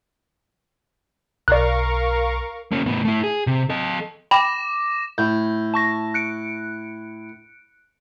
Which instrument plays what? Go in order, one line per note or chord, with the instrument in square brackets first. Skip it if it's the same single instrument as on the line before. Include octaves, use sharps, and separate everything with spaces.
[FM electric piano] B1 [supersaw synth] A#4 F5 C#6 [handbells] D5 F#6
[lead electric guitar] A#3 C#4
A2 B3
A3 E4
G#4
C3
A4 D#5
[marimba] G5 [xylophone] B5 [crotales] D6 A#6 E7
[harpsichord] A2 [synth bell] G6
[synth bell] A5 C#6 A#6
F#6 C#7 D7